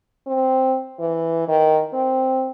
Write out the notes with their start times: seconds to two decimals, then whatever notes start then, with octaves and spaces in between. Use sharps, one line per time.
0.27 C4
0.99 E3
1.48 D#3
1.93 C4